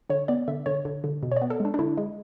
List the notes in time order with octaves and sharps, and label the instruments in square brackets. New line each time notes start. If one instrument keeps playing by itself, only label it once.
[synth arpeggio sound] D3 C#5
B3 D5
D3 E5
D3 C#5
D3
D3
B2
C#5
B3 D5
A4
G#3 D4
D4
D3 E4
G#3